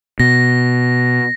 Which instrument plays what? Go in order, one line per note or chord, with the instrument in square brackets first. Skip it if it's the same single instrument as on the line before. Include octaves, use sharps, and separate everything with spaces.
[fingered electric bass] B2 [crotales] A#6